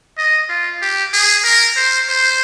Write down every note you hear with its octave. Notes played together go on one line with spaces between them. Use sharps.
D#5
F4
G4
G#4
A#4
C5
C5